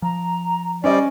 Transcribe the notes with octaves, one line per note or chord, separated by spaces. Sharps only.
F3 A#5
G3 C#4 C5 D5 D#5